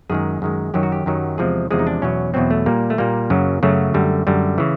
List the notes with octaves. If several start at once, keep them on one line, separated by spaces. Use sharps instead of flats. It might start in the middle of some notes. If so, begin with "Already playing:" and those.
F#2 D#3 G#3 G#4
F#2 D#3 G#3
F#2 D#3 F#3 G4
F#4
G4
F#2 D#3 F#3
E2 C3 F3 G#3 G#4
E2 C3 F3 G#3 G#4
D#4
D4
E2 B2 F#3 C#4
E2 B2 F#3 C4
A3
A#2 G3 A#3
A3
A#2 G3 A#3
F#2 C#3 F#3
F#2 C#3 F#3 A3
F#2 D3 G3
F#2 D3 G3
C#3 E3